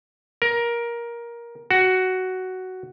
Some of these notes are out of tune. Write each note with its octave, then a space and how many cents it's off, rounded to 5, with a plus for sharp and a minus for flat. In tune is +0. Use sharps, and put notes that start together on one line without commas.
A#4 +15
F#4 +10